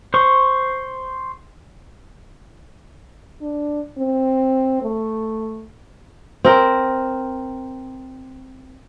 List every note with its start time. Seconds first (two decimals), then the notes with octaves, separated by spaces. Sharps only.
0.14 C5 C#6
3.41 D4
3.98 C4
4.83 A3
6.45 C4 A#4